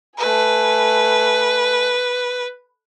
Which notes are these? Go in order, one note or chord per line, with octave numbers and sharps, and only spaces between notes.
A3 B4 G#5